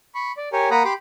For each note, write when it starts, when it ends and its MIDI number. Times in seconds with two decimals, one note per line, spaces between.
0.15 0.32 83
0.15 0.32 85
0.37 0.49 74
0.53 0.69 67
0.53 0.69 70
0.53 0.69 73
0.53 0.69 80
0.71 0.83 58
0.71 0.83 70
0.71 0.83 78
0.71 0.83 82
0.71 0.83 83
0.71 0.83 87
0.85 0.93 67
0.85 0.93 83
0.85 0.93 84
0.85 0.93 86